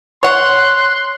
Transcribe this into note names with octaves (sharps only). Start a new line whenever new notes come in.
C#5 F#5 C6 F#6